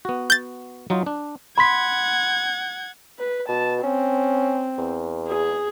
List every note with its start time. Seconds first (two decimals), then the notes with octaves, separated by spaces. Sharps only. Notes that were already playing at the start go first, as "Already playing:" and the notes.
0.05 B3 F#4
0.30 G6 A6
0.90 F#3 D#4 F4
1.06 D4
1.58 F#5 B5 C6 G#6 B6
3.19 B4
3.49 B2 A5
3.84 C4 C#4
4.78 E2
5.28 G#4